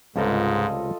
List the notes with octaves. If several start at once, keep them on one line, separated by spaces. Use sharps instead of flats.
C#2 G#2 C3 G3 F4 A4 D#5